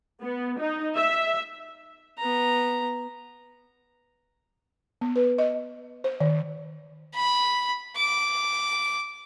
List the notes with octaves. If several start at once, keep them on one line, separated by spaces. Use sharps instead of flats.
B3
D#4
E5
B3 A#5
B3
B4
D#5
C5
D#3
B5
D6